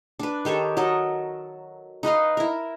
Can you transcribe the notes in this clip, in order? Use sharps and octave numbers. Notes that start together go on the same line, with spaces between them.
D4 B4
D#3 G4 A4 C#5
F#3 A4 A#4 D#5
D#4 B4 D#5 F5
E4 A#4